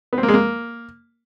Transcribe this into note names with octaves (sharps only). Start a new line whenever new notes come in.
B3
C4
A#3
G#3
A#3